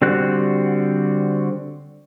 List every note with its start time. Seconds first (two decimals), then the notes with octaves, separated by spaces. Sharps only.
0.02 D3 G3 C4 F#4 F#6